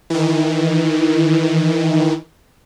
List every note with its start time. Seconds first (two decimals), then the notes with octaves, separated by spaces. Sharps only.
0.10 D#3 E3